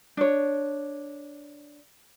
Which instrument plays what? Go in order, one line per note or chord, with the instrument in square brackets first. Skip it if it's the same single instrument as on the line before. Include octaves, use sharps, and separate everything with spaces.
[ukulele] D4 C#5